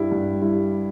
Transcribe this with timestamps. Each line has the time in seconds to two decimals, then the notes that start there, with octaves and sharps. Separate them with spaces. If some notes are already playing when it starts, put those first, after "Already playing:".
Already playing: G2 G3 E4
0.12 G2
0.41 G3 E4